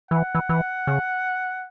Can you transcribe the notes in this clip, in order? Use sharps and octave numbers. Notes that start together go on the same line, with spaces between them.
E3 F#5
E3
E3
C#3